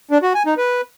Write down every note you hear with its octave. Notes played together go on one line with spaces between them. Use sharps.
D4
F#4
G#5
D#4
B4